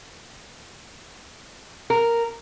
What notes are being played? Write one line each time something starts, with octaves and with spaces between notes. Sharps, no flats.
A#4